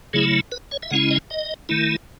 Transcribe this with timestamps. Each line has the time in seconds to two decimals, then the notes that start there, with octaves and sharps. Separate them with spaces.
0.13 C#3 F#3 A3 E4 G#4
0.52 B4
0.72 C#5
0.83 E5
0.91 C#3 G#3 C#4 E4 F#5
1.11 D#5
1.30 D#5
1.69 D#3 A3 E4